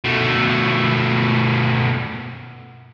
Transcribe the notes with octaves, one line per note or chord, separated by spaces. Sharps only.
B2 A3